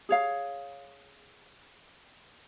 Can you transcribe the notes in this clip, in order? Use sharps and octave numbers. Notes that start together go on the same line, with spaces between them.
G#4 C#5 F5